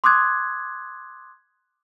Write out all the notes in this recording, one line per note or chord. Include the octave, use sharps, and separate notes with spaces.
C6 D6 D#6 F#6 G#6